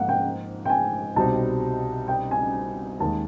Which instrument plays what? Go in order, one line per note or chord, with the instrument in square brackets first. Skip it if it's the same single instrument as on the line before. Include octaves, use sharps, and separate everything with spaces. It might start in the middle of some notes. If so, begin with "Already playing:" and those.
Already playing: [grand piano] G#2 F3 A#3 [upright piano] F5 F#5
[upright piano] G5
G5
G#5
[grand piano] C2 B2 G3 C4 D#4 [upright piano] A5
[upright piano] G5
G#5
[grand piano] D#2 D#3 G#3 [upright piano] A5